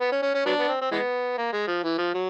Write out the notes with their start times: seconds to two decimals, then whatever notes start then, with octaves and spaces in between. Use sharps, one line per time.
0.01 B3
0.12 C#4
0.23 C#4
0.34 C#4
0.46 F#3 B3 D4
0.59 B3
0.68 C4
0.81 C4
0.92 E3 G#3 B3
1.38 A#3
1.53 G#3
1.67 F3
1.83 E3
1.98 F3
2.14 F#3